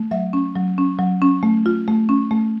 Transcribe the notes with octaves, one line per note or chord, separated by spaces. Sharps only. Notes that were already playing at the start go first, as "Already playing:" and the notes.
Already playing: A3
F#3 E5
C#4
F#3
C#4
F#3
C#4
A3
F4
A3
C#4
A3